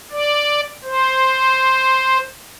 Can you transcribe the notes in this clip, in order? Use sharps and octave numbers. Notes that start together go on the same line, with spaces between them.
D5
C5